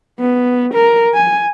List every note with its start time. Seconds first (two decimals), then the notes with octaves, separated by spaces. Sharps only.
0.19 B3
0.74 A#4
1.14 G#5